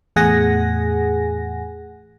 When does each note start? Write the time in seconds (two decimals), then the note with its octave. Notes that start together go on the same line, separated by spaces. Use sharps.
0.16 E2 A2 G#4 F#5 G#5 A#6